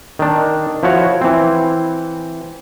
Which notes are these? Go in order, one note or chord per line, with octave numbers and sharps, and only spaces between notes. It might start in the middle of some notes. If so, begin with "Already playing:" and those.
D#3 D4
F3 E4 F#4 C#5
E3 C4